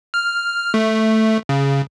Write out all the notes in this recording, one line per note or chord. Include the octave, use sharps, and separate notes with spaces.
F6
A3
C#3